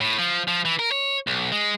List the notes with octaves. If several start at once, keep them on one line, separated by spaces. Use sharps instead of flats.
A2
F3
F3
E3
A#4
C#5
B1
G#3